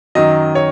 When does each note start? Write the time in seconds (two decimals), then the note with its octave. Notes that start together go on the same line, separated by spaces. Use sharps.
0.15 F#2 D#3 F#3 D#5
0.55 C#5